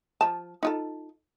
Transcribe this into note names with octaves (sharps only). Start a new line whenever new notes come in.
F3 A5
D#4 F4 A4